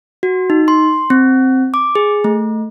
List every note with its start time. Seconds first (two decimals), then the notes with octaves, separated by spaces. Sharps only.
0.23 F#4
0.50 D#4
0.68 C6
1.10 C4
1.74 D6
1.95 G#4
2.24 A3